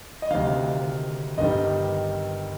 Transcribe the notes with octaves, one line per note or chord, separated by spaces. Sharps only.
D#5
D2 C3 D#3 F5
G1 G2 D#3 G3 D#5